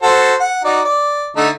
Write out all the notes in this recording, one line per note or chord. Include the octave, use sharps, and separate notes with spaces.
F#4 A4 C5
F#5
D#4 F#4 D5
D5
D3 A3 D#4